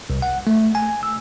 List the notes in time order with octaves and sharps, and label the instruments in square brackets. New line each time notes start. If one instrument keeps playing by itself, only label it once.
[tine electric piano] C2
F#5
A3
G#5
E6